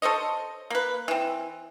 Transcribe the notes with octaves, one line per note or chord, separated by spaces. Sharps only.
A4 C5 C#5 D#5
A#3 B4
E3 C4